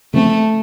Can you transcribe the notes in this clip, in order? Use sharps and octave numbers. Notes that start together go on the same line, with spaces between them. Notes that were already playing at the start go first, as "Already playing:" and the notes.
C#3 F3 A3 C4